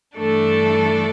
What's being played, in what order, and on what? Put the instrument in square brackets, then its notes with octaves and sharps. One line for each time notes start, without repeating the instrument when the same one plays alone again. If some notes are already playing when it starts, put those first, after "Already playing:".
[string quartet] G2 E3 A3 D4 A4